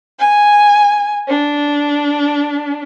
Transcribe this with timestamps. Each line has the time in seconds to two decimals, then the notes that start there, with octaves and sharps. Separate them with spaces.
0.19 G#5
1.27 D4